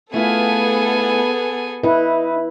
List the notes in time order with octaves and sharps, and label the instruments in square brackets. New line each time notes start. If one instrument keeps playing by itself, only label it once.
[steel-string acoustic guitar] A3 E4 F4 [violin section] B3 A4 [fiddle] G#4 G#5
[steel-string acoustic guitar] D#4 [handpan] E4 B4